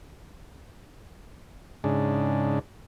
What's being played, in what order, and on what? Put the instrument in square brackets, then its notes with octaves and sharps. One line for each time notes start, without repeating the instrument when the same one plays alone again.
[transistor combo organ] G#2 C#3 D4